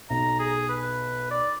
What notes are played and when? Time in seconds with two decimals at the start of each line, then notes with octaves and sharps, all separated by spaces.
0.10 B1 A#5
0.39 G#4
0.69 B4
1.31 D5